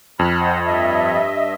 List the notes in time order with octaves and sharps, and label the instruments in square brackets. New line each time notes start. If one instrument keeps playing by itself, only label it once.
[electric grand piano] F2 [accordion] B5 F6 F#6
[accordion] C5 D#5 F#5
G2 D#5 E5